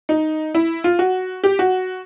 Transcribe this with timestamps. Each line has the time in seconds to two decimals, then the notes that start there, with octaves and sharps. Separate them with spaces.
0.09 D#4
0.55 E4
0.84 F4
0.99 F#4
1.44 G4
1.59 F#4